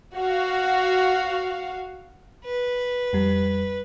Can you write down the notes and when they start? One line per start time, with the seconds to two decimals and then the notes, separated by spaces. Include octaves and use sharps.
0.15 F#4 F5
2.45 B4
3.13 F2 G3